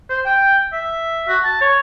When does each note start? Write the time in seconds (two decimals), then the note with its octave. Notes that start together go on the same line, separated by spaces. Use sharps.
0.10 C5
0.26 G5
0.73 E5
1.28 F#4
1.45 A5
1.61 C#5